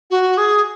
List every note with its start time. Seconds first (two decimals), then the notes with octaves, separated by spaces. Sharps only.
0.10 F#4
0.37 G#4